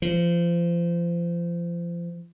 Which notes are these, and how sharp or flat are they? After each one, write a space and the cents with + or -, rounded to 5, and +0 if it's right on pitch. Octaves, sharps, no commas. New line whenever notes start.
F3 -30